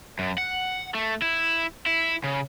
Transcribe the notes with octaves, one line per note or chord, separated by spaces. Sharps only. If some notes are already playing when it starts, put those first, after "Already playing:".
F#2
F#5
A3
E4
E4
C#3